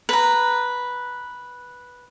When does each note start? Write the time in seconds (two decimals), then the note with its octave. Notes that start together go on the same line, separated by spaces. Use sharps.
0.09 B4 A#5